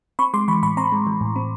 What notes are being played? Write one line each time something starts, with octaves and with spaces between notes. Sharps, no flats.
C4 B5 C#6
G#3 C6 D6
E3 B5 C#6
A2 B5 C#6
C4 A#5 C6
G#3
E3
A2
C4